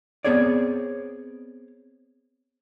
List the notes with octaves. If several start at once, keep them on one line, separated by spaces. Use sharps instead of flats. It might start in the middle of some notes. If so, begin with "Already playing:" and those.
B3 C4 G#4 C#5 D5